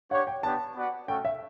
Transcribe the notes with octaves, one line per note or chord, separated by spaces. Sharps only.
D4 G4 C#5 F#5
G5
B3 D4 G4 A5
B3 F#4 B4 D5 F#5
A3 C#4 F#4 A4 G5
E5